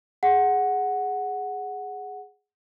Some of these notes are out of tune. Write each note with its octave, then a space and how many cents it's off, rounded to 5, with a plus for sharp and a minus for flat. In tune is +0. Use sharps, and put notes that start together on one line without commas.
G#4 +0 F#5 +0